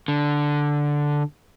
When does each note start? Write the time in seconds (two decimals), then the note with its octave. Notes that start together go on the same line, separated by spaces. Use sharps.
0.08 D3